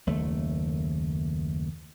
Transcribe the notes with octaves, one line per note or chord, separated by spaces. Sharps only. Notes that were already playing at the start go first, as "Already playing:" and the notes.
F#1 D#2 A3